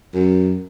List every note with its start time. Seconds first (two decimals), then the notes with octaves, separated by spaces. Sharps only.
0.14 F#2